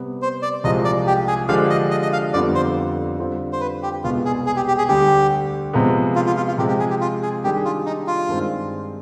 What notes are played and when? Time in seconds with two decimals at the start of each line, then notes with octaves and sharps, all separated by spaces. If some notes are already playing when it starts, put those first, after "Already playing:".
Already playing: C3 G3 B3
0.22 C5
0.42 D5
0.64 C2 C3 F3 G#3 D#5
0.85 D5
1.07 G4
1.28 G#4
1.48 D3 F3 G#3 D4 G4 F5
1.70 D#5
1.91 D#5
2.02 D#5
2.13 F5
2.33 F2 D3 G3 B3 F4 D5
2.55 C5
3.18 D3 G3 C4 F4
3.53 C5
3.61 B4
3.83 G4
4.04 C2 B2 G#3 B3 F4
4.25 G#4
4.46 G#4
4.56 G4
4.68 G4
4.78 G#4
4.88 D2 D3 G3 G4
5.73 C3 F3 G#3 B3
6.15 F4
6.27 F4
6.37 F4
6.48 F4
6.58 C3 F3 G#3 C4 G4
6.69 G4
6.80 G#4
6.90 G4
7.01 F4
7.23 G#4
7.44 D#3 G3 D4 G4 G#4
7.65 F4
7.86 D#4
8.07 F4
8.29 G2 D#3 G#3 C4